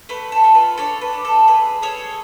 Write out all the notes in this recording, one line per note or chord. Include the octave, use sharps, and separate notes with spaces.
A3 B4
A4
F4
B4
D4 A4 C#5
B4
D4
A4
G#4 B4
G#4 A4 C#5